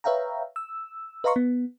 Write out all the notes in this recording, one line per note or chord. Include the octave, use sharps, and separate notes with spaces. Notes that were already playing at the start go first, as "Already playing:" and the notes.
B4 C#5 E5 F5 G5 A#5
E6
B4 D#5 F5 A#5 C6 C#6
B3